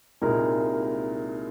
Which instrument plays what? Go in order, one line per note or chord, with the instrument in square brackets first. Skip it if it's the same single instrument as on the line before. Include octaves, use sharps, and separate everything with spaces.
[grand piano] C2 A#2 G#3 D#4 A#4